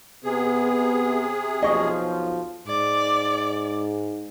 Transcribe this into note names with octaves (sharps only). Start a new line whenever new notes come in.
C3 B3 G#4
B1 F3 D#5 C#6
G#2 D5